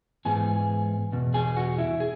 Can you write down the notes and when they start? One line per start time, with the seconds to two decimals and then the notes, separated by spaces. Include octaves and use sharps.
0.25 G#2 E3 B3 G#4 G#5
1.12 E2 B2
1.34 G#4 G#5
1.56 F#4 F#5
1.78 E4 E5
2.00 G#4